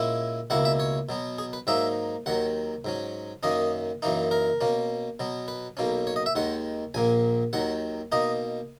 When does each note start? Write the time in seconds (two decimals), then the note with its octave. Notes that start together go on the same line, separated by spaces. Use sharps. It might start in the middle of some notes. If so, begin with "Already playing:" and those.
Already playing: A#2 G#3 C#4 E4
0.50 C#2 B2 A#3 E4 F#5
0.65 E5
0.80 C#5
1.09 B2 F#3 B3
1.38 G#4
1.53 B4
1.67 G#2 F#3 A#3 D#4 E5
2.26 D#2 D#3 F#3 F#5
2.85 G#2 F#3 C#4
3.43 F#2 D#3 A#3 C#4 D#5
4.02 F#2 E3 A#3 D#4
4.31 A#4
4.61 B2 A#3 C#4
5.20 B2 F#3 B3
5.48 B4
5.77 B1 B2 A#3 C#4
6.07 C#5
6.16 D#5
6.26 E5
6.35 D#2 D#3 G#3 F#5
6.94 A#1 A#2 A#3 G#5
7.53 D#2 D#3 F#3 F#5
8.12 B2 A#3 D#4 D#5